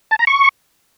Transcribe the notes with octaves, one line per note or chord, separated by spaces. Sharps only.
A5
A#5
C#6